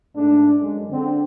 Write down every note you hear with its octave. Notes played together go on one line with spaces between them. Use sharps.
G#2 A3 D4
F#2 G#3
D3 C4